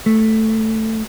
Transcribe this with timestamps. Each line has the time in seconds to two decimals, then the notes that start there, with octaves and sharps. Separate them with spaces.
0.06 A3